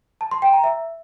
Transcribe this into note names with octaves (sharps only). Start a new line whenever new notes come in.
A5
C6
G5
A#5
E5